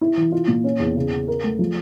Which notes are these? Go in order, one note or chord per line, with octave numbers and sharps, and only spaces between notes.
E4
E3
F4
A#2
C#4
E2
C#3
C#3
A#4
A3
F3